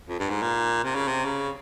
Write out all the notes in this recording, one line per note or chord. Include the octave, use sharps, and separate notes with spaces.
F2
G2
G#2
A#2
C3
C#3
C3
C#3